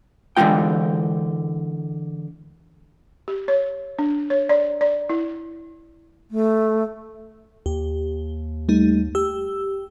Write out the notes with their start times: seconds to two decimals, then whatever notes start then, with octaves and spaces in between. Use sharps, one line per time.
0.36 D3 E3 F#3 G#3 F4 G5
3.28 G4
3.48 C#5
3.99 D4
4.30 C#5
4.49 D5
4.81 D5
5.09 E4
6.31 A3
7.66 D#2 G4
8.69 G3 A3 D#4
9.15 G4 E6